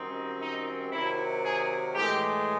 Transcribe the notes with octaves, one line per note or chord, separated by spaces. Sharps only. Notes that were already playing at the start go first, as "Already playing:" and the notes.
Already playing: F#2 D#3 G3 C4 D#4
D#4
C3 D#3 F#3 E4
G#4
A2 E3 G#3 G4